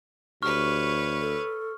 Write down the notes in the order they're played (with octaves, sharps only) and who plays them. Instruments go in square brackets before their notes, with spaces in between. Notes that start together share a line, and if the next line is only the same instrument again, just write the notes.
[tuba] D2 [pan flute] G4 [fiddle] B4 C#5 [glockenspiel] C#6 F6
[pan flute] A4